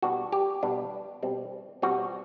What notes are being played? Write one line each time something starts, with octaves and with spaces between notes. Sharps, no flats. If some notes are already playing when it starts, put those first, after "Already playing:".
B2 G3 B3 D4 F#4
G4
B2 G3 B3 D4
B2 G3 C4
B2 G3 C4 F#4